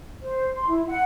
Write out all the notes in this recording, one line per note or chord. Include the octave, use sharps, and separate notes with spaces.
C5
C6
E4
F#5